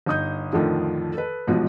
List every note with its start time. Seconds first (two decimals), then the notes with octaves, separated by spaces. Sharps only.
0.06 G1 D#4 D#6 G6
0.53 F2 A2 D3 D#3 F3
1.14 A4 B4
1.47 A1 G#2 B2 F3